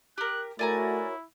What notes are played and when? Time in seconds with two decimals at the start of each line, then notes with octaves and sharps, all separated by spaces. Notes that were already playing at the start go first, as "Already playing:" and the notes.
0.18 G4 A#4 F#6
0.59 A3 E4 F#4 A#4 C#5 D5 G#5 A#5